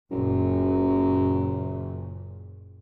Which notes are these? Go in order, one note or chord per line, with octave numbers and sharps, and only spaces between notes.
F#1 F#2 A#2